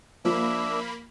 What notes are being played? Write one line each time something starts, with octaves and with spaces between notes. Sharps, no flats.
F3 A#3 D4 E5 B5